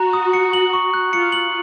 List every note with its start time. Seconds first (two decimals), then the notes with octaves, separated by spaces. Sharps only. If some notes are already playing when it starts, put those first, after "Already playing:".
Already playing: F#4 A#5
0.13 D#6
0.33 C#7
0.53 F#7
0.73 C#6
0.94 F#6
1.12 F4 C#7
1.32 F#7